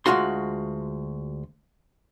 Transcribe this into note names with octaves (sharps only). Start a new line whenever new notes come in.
D2 C3 G#3 F4 F#4 C6